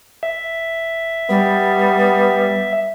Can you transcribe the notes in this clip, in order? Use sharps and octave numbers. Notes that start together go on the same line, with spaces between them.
E5
G3 B3